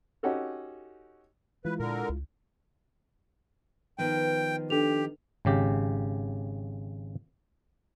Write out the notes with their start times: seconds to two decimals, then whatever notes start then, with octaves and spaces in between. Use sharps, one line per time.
0.23 C#4 D#4 F#4 G4 A4
1.65 E3 G#3 E4 F4 B4
1.80 A#2 D3 A#4
2.09 C#2
3.98 D#3 F3 B3 G5
4.70 D4 G4 A4 F7
5.45 G#1 C#3 G4